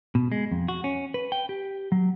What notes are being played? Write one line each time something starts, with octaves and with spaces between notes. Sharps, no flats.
B2
G#3
F2
F#4
C#4
B4
G5
G4
F#3